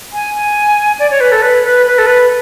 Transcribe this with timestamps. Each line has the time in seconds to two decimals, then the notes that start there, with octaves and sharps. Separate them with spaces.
0.13 G#5
0.34 G#5
0.99 D5
1.11 C#5
1.20 B4
1.32 A4
1.42 B4
1.64 B4
1.86 B4
1.98 A4
2.07 B4